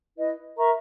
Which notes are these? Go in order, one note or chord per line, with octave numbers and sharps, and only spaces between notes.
E4 B4 D#5
A#4 E5 A#5 C#6